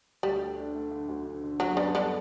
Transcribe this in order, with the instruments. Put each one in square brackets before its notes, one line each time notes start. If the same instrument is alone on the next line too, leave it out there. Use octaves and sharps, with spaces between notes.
[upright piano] D2 [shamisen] G3
[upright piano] A3
D4
A3
D3
D2
D3
D3
[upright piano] F#2 [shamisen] F#3
[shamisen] D3 [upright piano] B3
[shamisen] D3 [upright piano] G3